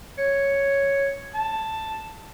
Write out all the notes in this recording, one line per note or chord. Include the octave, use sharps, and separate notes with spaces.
C#5
A5